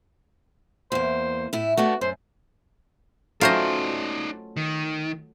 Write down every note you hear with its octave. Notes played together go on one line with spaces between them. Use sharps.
E2 A#3 C5
A2 E4
A3 B3 D4 F#4
F#2 C5
F#3 A3 C#4 D#4 F4 C5 D5 D#5
D#3